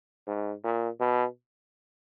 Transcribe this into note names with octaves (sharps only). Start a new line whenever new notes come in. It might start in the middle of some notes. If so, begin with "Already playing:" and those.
G#2
A#2
B2